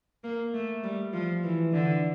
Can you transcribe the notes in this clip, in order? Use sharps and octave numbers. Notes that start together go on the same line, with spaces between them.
A#3
A3
G3
F3
E3
D3